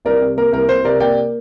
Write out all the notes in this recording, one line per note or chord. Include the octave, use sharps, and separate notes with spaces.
C2 A#4 D5
C3
A#3 A#4
C2 A#4
C2 C5
C3 A#4 D5
A#3 D5 G5